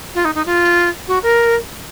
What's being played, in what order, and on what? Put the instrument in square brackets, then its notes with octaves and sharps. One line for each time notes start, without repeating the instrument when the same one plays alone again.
[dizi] F4
D#4
D#4
F4
F#4
A#4